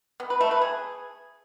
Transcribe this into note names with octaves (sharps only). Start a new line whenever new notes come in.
B3
B4
A3
B4
G#4